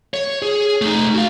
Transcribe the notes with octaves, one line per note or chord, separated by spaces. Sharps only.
C#5
G#4
A3 D#4
F#4 F5